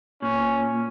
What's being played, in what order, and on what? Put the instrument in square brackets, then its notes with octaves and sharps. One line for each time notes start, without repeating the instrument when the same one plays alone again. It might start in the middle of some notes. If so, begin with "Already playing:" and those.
[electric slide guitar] A#2 [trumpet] C#4